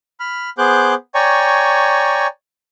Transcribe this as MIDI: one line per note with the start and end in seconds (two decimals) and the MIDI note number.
0.20 0.50 83
0.20 0.50 89
0.58 0.94 59
0.58 0.94 68
0.58 0.94 72
0.58 0.94 86
0.58 0.94 90
0.58 0.94 91
1.15 2.27 73
1.15 2.27 74
1.15 2.27 79
1.15 2.27 80
1.15 2.27 82
1.15 2.27 85